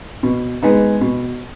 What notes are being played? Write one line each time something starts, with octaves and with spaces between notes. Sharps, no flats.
B2
G#3 B3 D#4
B2